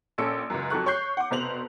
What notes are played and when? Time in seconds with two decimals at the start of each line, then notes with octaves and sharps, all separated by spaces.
0.18 A#1 C#4 A4 E6 C#7 D7
0.50 C#2 F#2
0.70 F2 F#3 A4 C#6 F#6
0.86 C#5 C#6 F#6 G6 C7
1.17 F#5 D6
1.31 F1 B2 C5 F7 F#7